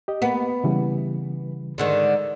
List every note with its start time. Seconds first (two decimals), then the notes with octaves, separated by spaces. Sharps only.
0.08 G4 D#5
0.22 A#3 B3
0.64 C#3 E3 G3
1.78 G#2 D3 D#3